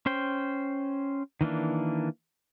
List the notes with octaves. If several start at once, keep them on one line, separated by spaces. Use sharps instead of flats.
C#4 C5 G5
D#3 E3 A#3 D4